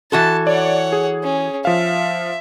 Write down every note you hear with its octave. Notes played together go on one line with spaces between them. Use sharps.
E3 F#4 A4 A5
C#5 D5 F#5
G#4
C#4
F3 E5 F5